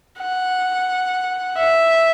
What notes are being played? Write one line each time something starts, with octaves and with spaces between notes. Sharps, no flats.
F#5
E5